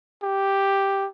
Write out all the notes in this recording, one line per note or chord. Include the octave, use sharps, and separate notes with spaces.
G4